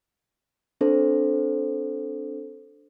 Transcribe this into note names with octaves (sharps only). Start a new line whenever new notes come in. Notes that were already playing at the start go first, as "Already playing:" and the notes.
C4 D4 A4 C5